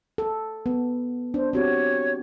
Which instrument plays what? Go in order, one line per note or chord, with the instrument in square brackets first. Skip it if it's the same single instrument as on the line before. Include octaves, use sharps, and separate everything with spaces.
[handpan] A4
B3
[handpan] D4 [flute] C5
[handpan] C4 F#4 G4 [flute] C#5